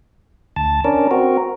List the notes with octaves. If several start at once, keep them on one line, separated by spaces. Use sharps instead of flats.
D2 A5
C#4 D4 A#4
C4 F#4 A#4